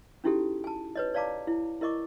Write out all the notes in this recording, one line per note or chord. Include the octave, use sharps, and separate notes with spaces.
C#4 D#4 E4 F#4 G4 A4
G#5 A5
B4 C#5 D#5
C#5 D5 F5 A5 A#5 D6
E4
E4 A#4 D#5 C#6 D6